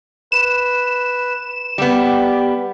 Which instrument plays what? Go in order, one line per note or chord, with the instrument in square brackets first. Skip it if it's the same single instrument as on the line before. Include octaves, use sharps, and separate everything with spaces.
[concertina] B4 [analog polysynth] E7
[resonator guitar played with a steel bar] G3 B3 [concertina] G4